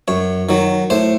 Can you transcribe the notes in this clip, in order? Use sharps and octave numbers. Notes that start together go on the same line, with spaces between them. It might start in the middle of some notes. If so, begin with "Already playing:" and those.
F#2 C#5
D#3 F#3
A2 C5